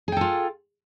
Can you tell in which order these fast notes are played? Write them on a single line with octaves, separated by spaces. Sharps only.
G#4 G5 A4 F4